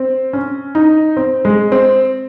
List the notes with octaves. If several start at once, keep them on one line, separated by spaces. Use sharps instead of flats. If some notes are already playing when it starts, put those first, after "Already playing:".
Already playing: C4
C#4
D#4
C4
G#3
C4